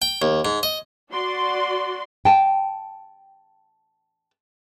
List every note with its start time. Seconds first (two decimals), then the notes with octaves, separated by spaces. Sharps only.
0.02 G5
0.22 D#2
0.45 G#2
0.63 D#5
1.11 F#4 D5 C6
2.25 G5 A5